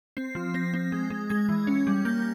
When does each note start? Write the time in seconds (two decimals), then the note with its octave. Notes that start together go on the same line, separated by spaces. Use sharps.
0.17 C4 C7
0.35 F3
0.54 C4 A#6
0.74 C4
0.92 G#3
1.10 G#3
1.30 G#3 G#6
1.49 E3
1.67 C#4
1.87 G3
2.05 A#3 G6